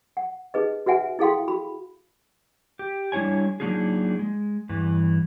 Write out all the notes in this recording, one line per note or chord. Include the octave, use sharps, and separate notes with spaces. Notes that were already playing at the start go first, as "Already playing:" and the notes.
F#5
D#4 G#4 B4 D#5
F#4 B4 E5 F#5 G#5
E4 G#4 A4 F5 G5 C6
F#4 B5
G4
G3 D4 E4 C#5 G#5
F#3 A#3 D4 D#4 F4 G#4
G#3
E2 G2 E3